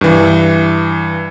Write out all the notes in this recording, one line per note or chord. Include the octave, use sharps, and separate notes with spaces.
G2 E3